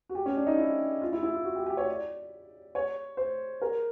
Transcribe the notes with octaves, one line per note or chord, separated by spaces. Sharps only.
F#4
G4
C#4
D4
D#4
E4
F4
E4
E4
F4
F#4
G4
G4
C#5
D5
C#5
C5
A#4